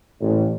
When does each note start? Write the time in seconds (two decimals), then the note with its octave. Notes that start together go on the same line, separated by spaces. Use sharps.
0.21 A1